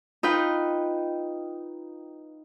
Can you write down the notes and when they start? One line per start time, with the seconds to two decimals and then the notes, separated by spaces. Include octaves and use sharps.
0.23 D#4 F4 B4 G5